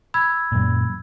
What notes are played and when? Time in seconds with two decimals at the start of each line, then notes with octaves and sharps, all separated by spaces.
0.14 B5 E6 G#6
0.52 F#2 A#2